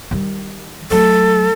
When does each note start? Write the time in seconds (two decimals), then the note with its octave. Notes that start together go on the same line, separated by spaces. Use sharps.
0.11 D#3 G3
0.91 F#3 A3 A4